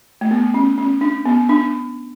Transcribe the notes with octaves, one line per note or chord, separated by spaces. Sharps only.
A3
B3
C#4
C#4
D4
B3
D4